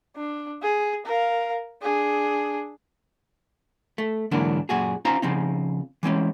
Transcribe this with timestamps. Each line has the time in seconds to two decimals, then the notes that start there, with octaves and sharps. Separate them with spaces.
0.16 D4
0.62 G#4
1.05 A#4 F5
1.82 D4 G#4
3.98 A3
4.31 G#2 D3 E3 F#3 A#3 D4
4.69 F#2 A#2 F#4 G#4
5.05 C#4 D#4 F4 C5 F5 A#5
5.22 C#3 F3 C4 D#4
6.03 E3 G#3 C4 C#4